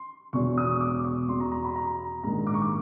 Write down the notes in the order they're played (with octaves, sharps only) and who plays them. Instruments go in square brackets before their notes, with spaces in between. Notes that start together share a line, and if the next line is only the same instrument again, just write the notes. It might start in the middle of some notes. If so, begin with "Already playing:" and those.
Already playing: [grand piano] C6
E1 E2 B2 C#6
D#6
D6
C#6
E2 B2 C6
A#5
A#5
B5
A#5
A#1 G#2 D#3 A#5
D6
C#6
D6